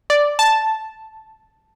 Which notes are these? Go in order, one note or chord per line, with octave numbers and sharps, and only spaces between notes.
D5
A5